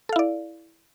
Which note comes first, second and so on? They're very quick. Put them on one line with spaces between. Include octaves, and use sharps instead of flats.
A4 F5 E4 D5